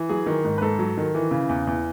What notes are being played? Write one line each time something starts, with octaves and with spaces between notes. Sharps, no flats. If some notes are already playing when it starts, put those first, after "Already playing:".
Already playing: E3
F#3 G#4
D#3
G#2
B4
G#2 A4
F#3
D#3
E3
C#3
E2
E2